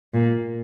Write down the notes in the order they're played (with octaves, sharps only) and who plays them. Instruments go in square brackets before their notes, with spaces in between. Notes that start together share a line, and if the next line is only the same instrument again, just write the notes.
[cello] A#2